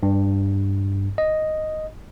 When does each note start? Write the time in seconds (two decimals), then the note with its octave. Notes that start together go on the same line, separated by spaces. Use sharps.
0.03 G2
1.18 D#5